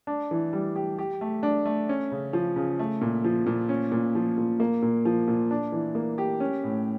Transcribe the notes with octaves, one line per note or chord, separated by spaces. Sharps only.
D4
E3
G3
G4
G4
A3
D4
A3
C#4
C#3
F3
C#3
A3
A#2
F3
A#2
C#4
A#2
F3
A#2
A#3
A#2
F3
A#2
D4
E3
A#3
G4
C#4
A2